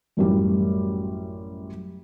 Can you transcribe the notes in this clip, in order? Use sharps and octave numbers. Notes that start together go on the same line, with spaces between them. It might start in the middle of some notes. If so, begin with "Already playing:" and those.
A1 F#2 G3